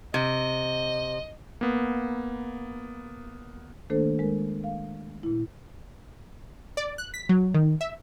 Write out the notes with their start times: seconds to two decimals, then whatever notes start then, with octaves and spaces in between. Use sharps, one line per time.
0.14 C3 D#5
1.61 A#3 B3
3.90 D#3 A3 A#3 D4 A4 C5
4.19 G#3 A#4
4.64 F5
5.23 A#2 E4
6.77 D5
6.98 F#6
7.14 B6
7.29 F#3
7.54 D#3
7.81 E5